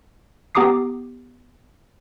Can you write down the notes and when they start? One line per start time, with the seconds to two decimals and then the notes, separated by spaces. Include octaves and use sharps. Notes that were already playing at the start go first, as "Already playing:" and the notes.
0.55 B3 G4 A#5 D6 D#6 C7